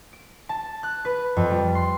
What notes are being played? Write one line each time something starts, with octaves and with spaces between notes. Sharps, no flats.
D7
A5
F#6
B4
F2
G3
C6